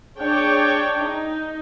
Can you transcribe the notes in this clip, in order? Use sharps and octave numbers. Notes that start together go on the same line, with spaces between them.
D4 G#4 C#5 G5
D#4